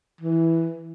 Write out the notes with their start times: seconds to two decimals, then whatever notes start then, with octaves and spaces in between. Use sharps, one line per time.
0.21 E3